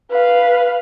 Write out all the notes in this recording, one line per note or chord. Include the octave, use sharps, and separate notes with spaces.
B4 F5